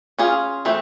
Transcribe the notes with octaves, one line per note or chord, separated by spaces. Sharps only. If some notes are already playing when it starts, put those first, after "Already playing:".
C#4 F4 G#4
E3 A3 C4